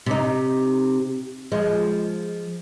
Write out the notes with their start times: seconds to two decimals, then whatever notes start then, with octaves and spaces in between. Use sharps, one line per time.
0.06 C3 D#4
1.52 F3 G#3